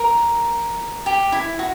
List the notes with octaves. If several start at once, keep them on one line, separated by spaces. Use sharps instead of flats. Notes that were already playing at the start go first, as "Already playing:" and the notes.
Already playing: A#4
G4
E4
F#4